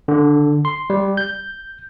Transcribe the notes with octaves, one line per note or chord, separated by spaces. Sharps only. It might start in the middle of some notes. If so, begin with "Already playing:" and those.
D3
C6
G3
G6